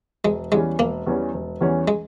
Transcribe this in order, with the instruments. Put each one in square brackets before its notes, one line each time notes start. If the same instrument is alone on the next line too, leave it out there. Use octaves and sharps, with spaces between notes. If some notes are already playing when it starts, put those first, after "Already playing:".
[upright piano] E1 [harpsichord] G#3
[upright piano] E2 E3 G3 C#4 [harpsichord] G#3
[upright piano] E1 [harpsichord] A#3
[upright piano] E2 E3 G3 C#4
E1
E2 E3 G3 C#4
[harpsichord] G#3